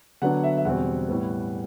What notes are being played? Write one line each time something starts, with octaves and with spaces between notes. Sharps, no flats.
D3 F#3 B3 D4 F#5
E5
E5
E2 B2 G3 C4 F#5
A2 G3 B3